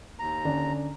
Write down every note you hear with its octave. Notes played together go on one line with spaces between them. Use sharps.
D#2 A#5
D3 C#4 D4